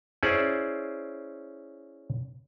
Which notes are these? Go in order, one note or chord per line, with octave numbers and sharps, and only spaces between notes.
C#4 E4 G#4 C5 D5